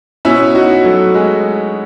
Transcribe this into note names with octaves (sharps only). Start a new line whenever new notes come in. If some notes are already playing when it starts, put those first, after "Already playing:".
B2 C#4 E4
D#4 F#4
F#3 A3
G#3